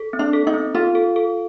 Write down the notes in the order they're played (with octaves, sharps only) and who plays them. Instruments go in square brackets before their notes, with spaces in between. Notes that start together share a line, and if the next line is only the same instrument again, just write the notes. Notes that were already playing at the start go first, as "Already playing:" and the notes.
Already playing: [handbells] A4
C4
[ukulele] D4
[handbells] A4
[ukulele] D#4
[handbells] C4
[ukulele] F4 [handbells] A4
[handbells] A4
A4